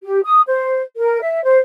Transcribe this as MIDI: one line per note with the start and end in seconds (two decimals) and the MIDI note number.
0.03 0.20 67
0.24 0.42 87
0.47 0.81 72
0.96 1.20 70
1.22 1.42 76
1.44 1.58 72